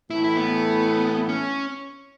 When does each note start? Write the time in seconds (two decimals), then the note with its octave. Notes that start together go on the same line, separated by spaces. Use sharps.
0.10 A2 E3 A3 E4
0.24 E4
0.37 B3
1.29 C#4